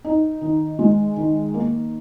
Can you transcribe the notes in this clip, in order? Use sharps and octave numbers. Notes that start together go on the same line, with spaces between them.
D#4
D#3
G#3
D#3
A#3